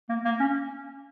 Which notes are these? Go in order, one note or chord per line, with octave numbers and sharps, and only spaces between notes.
A#3
A#3
C#4